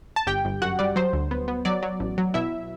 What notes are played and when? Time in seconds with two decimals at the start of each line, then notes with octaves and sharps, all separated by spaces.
0.16 A5
0.27 G1 G4 G5
0.45 G1
0.62 F#2 F#4 F#5
0.79 G3 D5
0.96 F#3 C5
1.13 D2
1.31 B3
1.48 B3
1.65 F#3 D5
1.82 F#3
2.00 A1
2.18 F#3
2.34 B2 E4 E5